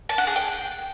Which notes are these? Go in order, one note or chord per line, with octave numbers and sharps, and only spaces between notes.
A5
F#5
G#4
G5